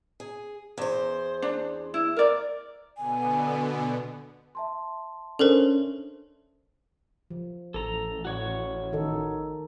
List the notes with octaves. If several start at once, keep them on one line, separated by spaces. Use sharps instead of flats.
G#4
E2 C5
D4
E4
A#4 D5
B2 D3 B3 G#5
E5 A5 C6
C#4 D4 A4 A#4 C5
F3
A1 A4 A#5
F#4 C#5 C#6
D#3 D#4 A4